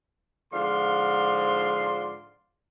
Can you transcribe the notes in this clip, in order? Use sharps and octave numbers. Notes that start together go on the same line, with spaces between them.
G#2 D3 F3 D5 F5 C6